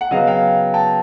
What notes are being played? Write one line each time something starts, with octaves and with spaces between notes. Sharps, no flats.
F#5
C#3 F#3 B3 D#5 F5
F5 G5
G5 A5